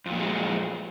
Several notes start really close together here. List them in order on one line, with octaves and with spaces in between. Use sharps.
F2 A#2 F#3 G#3